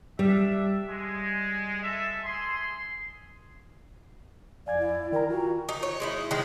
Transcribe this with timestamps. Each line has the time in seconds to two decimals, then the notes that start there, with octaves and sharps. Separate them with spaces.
0.19 G3 D4 E5
0.89 G#3
1.83 A4 E5
2.24 G#4 C6
4.67 F2 D5 F5 G#5 G#6
4.78 E4
5.12 D#3 A#4 G5 A#5
5.29 F4 F#4
5.69 D#4
5.83 C#5
6.00 G#3 D#4 E4
6.31 D#3 G#3